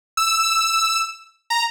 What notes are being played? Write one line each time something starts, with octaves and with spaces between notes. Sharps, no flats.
E6
A#5